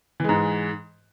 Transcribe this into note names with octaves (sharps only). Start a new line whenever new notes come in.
G#2 E3 G#3